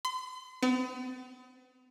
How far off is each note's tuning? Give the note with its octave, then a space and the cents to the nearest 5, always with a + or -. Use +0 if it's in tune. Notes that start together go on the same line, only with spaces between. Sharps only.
C6 -40
B3 +45